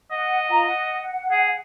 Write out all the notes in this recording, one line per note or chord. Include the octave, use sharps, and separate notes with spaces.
D#5 F#5
F4 A#5
F#5
G#4